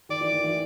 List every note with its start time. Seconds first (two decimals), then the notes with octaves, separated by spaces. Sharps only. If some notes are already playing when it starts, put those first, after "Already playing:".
0.09 D#3 D5
0.21 E3
0.32 D#3
0.44 E3